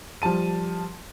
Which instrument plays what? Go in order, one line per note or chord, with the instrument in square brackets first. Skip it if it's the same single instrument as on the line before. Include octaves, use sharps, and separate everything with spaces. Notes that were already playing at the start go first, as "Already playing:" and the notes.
[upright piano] F3 G3 A5 D#7